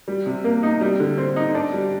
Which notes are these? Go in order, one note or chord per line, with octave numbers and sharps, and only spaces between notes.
G3
C3
A#3
D#4
G3
D3
C4
D#4
D4
G3